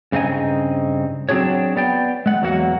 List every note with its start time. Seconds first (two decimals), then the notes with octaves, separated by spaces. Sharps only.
0.12 G2 C#3 C4 D#4 D#5 G#5
1.29 F#3 C4 D4 F#4 G#4 C#5
1.76 B3 D5 G5
2.26 G#3 F#5
2.42 E2 F#3 A#3 F#4 F#5